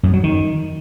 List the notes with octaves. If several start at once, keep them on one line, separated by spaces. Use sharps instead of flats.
F#2
F#3
D#3